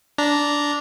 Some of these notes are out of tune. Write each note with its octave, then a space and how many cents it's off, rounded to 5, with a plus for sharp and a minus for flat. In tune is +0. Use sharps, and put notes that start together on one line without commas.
D4 -10 A#5 +0